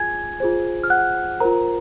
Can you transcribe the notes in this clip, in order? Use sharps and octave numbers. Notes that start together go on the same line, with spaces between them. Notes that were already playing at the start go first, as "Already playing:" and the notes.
Already playing: F4 G#4 G#5 G#6
F4 G#4 C5
F6
F#5 F#6
F4 A#4 C5 A#5